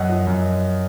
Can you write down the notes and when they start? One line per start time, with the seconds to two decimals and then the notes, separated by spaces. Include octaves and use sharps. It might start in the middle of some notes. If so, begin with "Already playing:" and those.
Already playing: F#2 D#5 F#5
0.09 F3
0.27 F#2